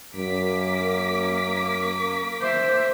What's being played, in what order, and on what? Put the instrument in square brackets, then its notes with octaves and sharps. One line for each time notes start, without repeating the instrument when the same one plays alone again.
[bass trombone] F#2 [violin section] A#3 D6 B6
[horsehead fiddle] C5 E5